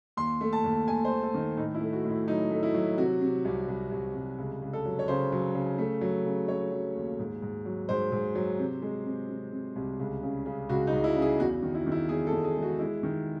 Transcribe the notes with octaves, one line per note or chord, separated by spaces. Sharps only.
D#2 C6
A3
A5
D#2
D#2 G#5
C5
D#2
A4
D#3
A2 D#4
E4
A3
F#4
A2
E4
F#3 D#4
A3
E4
F#3
C3 F#4
C3
C2
C2
C2
C2
C#2
C#2
A4
F#3
C#5
C#3 C5
F#3
C#3
A3
F#3
C#3
A3 C#5
F#3
D#2
G#2
G#2
F#3
G#2 C5
G#2
F#3
C3
G#3
C3
C3
C3
C2
C#2
C#3
C#3
C#2 F#4
D#4
C#2
E4
C#3
G#4
E2 F#4
D#3
E4
D#3
E4
E2 G#4
A4
E2
G#4
G#3
F#4
G#3 E4
D#3